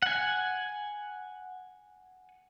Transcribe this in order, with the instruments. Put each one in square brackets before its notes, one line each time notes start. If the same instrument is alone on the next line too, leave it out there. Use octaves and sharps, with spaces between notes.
[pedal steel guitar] F#5 G#5